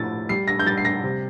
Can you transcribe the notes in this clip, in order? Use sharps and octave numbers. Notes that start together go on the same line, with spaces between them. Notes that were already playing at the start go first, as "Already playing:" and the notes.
Already playing: A2 F3 A6
G3 C7
A#6
G6
G3 A6
C7
A#6
C3